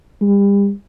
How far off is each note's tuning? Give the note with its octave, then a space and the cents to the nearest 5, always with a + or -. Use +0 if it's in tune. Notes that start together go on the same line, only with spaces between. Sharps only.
G3 +35